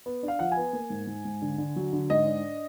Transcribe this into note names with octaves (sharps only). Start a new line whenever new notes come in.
B3
D4
F5
F3 F#5
G#5
B3
A#3
G#2
G#2
G#2
D3
D3
F#3
D3
G#2 D#5
D4